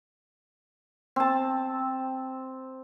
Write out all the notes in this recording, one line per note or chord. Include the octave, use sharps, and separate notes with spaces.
C4 A5